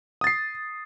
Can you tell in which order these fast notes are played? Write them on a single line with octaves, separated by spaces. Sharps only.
D#6 A6 C7